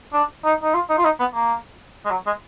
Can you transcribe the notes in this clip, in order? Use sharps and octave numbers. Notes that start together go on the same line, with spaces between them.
D4
D#4
D#4
F4
D#4
F4
D#4
B3
A#3
G#3
F#3
G#3